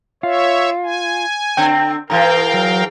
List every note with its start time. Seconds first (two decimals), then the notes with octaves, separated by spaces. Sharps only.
0.23 F4 C#5 E5
0.83 G#5
1.57 D3 C4 G5
2.10 G#2 E3 A#4 F5 G5 A#5
2.54 F#3